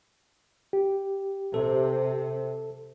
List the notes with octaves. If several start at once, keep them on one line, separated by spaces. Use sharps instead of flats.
G4
C3 A4